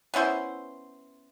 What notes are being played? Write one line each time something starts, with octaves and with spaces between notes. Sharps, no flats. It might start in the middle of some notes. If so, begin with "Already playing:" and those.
B3 C#4 E4 C5